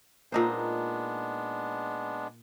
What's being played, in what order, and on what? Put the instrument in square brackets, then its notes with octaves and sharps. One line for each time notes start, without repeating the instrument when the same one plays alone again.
[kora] A#2 D#4 C5 [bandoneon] G#3 B3 D4